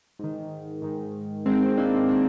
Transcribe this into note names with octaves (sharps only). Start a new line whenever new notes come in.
G#2 D#3
G#2 D#3
G#2 D#3 G#3 C4
A#3 D4
D#3 A#3 D4